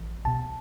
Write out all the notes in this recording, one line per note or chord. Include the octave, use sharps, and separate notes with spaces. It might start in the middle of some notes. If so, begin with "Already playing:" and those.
Already playing: A1 E3
C2 B2 A5